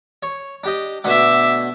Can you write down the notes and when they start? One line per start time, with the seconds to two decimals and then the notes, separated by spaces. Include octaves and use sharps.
0.23 C#5
0.64 D4 G4 D#5
1.04 B2 D3 A3 E5 D6